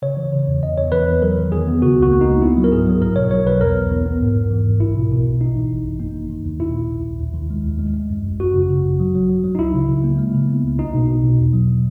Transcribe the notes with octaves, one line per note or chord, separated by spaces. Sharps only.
C#3 C#5
E3
C#3
E2
E2 D#5
E2 C#5
E3 B4
E2
F#3 A#4
D#3
E2 G#4
B3
C#3 F#4
C#2
F#4
A#3
D#4
C#2
B3 E4
F#3
A#4
G#2 G#4
F#3
B1 A#4
B2 C#5
F#3 C#5
B1 B4
E2 A#4
E2
E2
B3
G#2
G#2
E3
G#1
B1 E4
B2
B2
B1
G#1 D#4
E3
G#1
F#2
A#3 D#4
D#3
D#3
D#2
A#2 E4
A#1
A#1
A#1
D#2
D#3
G#3
D#2
G#3
G#3
F#2
G#1
F#2 F#4
C#3
C#3
G#1
F#3
F#3
F#3
F#3
D#4
C#2 E4
C#3
C#3
A#3
G#3
C#3
B3
C#2
B1 D#4
B2
B2
B2
E2
F#3